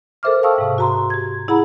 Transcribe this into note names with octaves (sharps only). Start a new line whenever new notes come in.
A4 A#4 C5 E5 D6 F6
F5 G5 A5 C#6 D#6 E6
G#2 C3
F#4 A#5 C6
G4 G#6
E4 G#4 F#5 A#5 B5